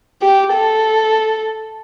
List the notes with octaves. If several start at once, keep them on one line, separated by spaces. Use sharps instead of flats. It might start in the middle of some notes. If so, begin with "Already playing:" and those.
G4
A4